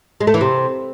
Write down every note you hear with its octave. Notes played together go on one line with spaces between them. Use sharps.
G#3
A3
E3
C3